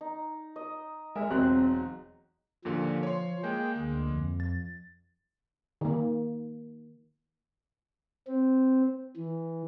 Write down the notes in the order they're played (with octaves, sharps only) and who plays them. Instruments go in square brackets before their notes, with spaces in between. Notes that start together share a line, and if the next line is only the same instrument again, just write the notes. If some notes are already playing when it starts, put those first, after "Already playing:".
[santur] D#4
D#5
[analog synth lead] G#3 [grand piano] A#4 E5
[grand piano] E1 F#3 F#6 [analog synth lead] C4
[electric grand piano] D#2 A#2 D3 [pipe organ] F3
[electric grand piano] C#5 C6
[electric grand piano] G#3 A#3 [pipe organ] G#4 G5
[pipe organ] D2
F2
[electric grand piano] A6
[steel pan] D#3 A#3
[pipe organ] C4
E3